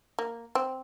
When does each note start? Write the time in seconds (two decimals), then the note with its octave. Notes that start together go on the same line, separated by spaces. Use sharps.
0.19 A#3
0.55 C4